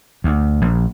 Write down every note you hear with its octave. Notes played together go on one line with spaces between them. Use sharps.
D2
A#1